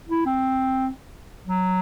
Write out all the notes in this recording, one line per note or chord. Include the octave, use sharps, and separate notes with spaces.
E4
C4
F#3